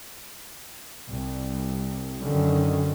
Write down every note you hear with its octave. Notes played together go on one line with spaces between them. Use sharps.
C2
F#2 D3 D#3 C#4